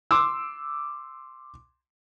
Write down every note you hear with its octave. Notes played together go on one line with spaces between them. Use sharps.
C6 D6 E6